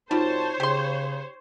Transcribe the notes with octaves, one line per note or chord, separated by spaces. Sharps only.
C2 G3 D#4 F4 F#4 C5 C#5 A5
C#3 G4 C6